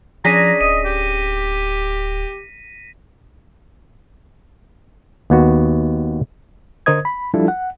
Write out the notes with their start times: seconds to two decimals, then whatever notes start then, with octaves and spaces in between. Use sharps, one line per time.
0.25 F3 C#4 D4 G#4 A#5 A#6 B6 D#7
0.61 D1 D#5 D#7
0.85 G4
5.30 D#2 B3 F#4
6.86 D3 A#4 C5 D#5 D#6 G#6
7.05 B5
7.34 F3 G3 D4 E4 F4 A4
7.48 F#5